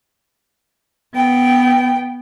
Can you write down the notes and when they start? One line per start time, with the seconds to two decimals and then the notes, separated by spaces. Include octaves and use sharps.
1.14 B3 G5